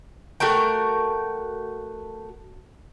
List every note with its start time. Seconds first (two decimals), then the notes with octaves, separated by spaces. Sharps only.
0.40 A3 F#4 A#4 G5